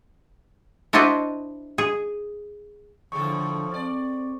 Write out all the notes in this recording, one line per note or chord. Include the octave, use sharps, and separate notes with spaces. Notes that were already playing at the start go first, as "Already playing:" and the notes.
D4 E4 F#4 C5 D5 D#5
G#4
D#2 A2 D3 F3 A4 C#6
C4 D5